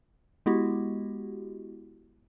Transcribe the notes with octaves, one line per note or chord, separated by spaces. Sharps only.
G#3 B3 E4 F#4 G4